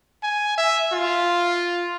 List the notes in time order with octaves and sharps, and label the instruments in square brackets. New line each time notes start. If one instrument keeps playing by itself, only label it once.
[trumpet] G#5
E5
F4